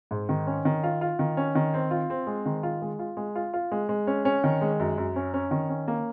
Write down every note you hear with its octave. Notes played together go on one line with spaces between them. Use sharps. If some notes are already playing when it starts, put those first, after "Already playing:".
G#2
D#3
C#4
D#3
F4
F4
D#3
C#4
D#3
C4
F4
C4
G#3
D#3
F4
G#3
F4
G#3
F4
F4
G#3
G#3
C#4
C#4
D#3
G#3
F#2
F#2
C#4
C#4
D#3
C#4
A#3